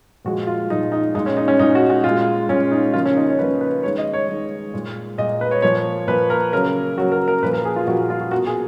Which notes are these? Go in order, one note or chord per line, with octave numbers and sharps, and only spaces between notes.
A#2 F3 G#3 F#4
F4
A#2 F3 G#3 D#4
D#4
A#2 G#3 D#4
C#4
D#4
C#4
A#2 G#3 D#4
F#4
F#4
A#2 G#3 F4
A#2 G#3 C#4
D#4
C#3 F3 A#3 F4
C#4
D#4
C#5
C#3 F3 A#3 B4
B4
D#3 G#3 C#5
D#5
C#5
D#3 G#3
A#2 G#3
A#2 G#3 D#5
B4
C#5
A#2 F3 A#3 C#5
A#2 F3 A#3 B4
A#4
C#3 F#3 A#3 A#4
C#3 F#3 A#3 F#4
A#4
A#4
A#2 F3 A#3 B4
A#4
G#4
F4
A#2 F3 A#3 F#4
F4
F#4
B2 A#3 F#4
G#4